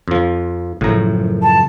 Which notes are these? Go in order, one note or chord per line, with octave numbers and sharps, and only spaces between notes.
F2 F3
F#1 F#2 A2 F3 A#5
A5